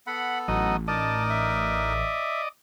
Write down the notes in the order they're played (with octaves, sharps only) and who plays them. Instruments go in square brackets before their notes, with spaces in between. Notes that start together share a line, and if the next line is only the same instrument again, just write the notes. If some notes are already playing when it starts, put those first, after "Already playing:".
[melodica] B3 A4 [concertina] F#5 B5
[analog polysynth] A1 [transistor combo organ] F#3 D#5 [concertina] D#4
[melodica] D#4 A#4 [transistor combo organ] D5 D#5 [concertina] A5
[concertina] E5